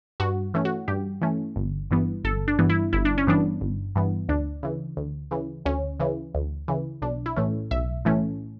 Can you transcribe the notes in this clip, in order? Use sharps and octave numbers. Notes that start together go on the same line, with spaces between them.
G2 F#4
E3 A3 C#4
F#4
G2 G4
E3 A3 C#4
G1
G2 E3 B3
G1 A4
D4
G2 E3 B3
E4
G1 E4
D4
C#4
G2 E3 B3 D4
G1
G2 E3 B3
D2 D4
C#3 E3
D2
C#3 E3
D2 C#4
C#3 E3
D2
C#3 E3
B1 D4
E4
A2 E3 A3 C#4
B1 E5
A2 E3 A3 C#4